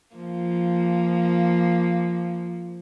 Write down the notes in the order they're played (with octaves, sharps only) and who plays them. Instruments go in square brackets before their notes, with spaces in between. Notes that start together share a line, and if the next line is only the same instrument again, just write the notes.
[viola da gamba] F3 A#3